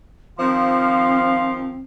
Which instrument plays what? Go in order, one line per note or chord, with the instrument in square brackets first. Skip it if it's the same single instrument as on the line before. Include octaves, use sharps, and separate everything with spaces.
[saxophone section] D#3 F3 [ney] C4 [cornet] F5